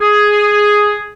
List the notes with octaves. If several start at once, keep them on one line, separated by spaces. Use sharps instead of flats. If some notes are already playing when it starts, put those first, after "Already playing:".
G#4